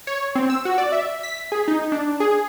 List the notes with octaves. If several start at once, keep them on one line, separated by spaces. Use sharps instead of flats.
C#5
C4
E6
F#4
D5
E5
B6
G#4
D#4
D4
G#4